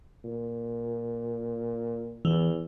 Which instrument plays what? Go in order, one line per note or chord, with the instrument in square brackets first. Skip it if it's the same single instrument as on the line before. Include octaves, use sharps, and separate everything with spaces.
[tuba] A#2
[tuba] E2 [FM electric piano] E3